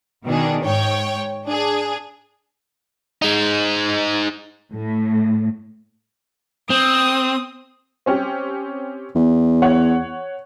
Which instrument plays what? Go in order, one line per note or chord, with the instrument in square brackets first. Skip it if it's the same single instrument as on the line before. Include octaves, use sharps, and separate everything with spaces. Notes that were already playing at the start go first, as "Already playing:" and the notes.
[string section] B2 D#3 D4 G#4
G#2 C#5 G5
D4 G#4
[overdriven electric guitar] G#3 D#4
[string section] A2
[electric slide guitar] C4 [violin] D#6
[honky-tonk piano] C4 C#4 G4
[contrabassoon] E2
[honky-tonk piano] C#5 F#5